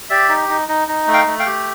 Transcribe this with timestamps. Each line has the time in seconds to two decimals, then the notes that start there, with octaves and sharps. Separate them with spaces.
0.10 G4 D5 E5
0.29 D#4
0.49 D#4
0.68 D#4
0.88 D#4
1.07 A3
1.14 F5 G5
1.27 A3
1.39 F5 G5
1.46 G4